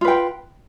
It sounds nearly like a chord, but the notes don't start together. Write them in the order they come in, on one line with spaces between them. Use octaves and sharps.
F4 B4 G5